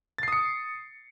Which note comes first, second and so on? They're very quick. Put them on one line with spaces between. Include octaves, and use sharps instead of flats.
A6 C7 D#6 C#7